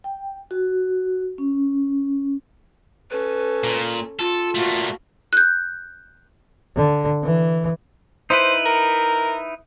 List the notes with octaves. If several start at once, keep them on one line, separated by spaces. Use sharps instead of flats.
G5
F#4
C#4
C#4 A4 B4
A#2
F4 A4
A#2 A3 F#4 F5
F#6 G6
D3
E3
D#4 E4 B4 C5
A#4